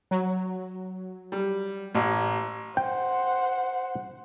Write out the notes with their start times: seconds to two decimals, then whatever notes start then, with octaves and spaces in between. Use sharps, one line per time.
0.11 F#3
1.32 G3
1.95 A1
2.77 C5 F#5 G5